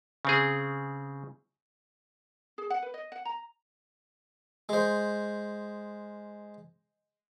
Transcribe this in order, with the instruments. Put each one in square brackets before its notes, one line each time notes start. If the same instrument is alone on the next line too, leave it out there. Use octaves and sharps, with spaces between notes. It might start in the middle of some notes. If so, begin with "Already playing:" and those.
[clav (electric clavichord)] C#3 C4 G#4
[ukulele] G#4
F#5
B4
D#5
F#5
A#5
[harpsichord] G#3 C5